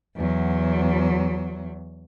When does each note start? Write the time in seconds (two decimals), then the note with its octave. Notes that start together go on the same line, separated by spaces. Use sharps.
0.16 E2 F#3